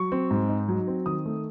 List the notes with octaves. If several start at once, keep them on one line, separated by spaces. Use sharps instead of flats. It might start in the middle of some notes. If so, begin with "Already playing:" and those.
Already playing: F#3 C#6
C4
G#2
D#4
F#3
C4
D#3 D#6
A3